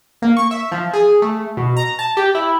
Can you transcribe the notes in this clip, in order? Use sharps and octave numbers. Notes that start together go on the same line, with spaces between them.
A#3
C#6
E5
F3
G#4
A3
B2
A#5
A5
G4
E4